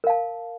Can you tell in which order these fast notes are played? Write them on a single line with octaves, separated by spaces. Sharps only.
A#4 F5 A5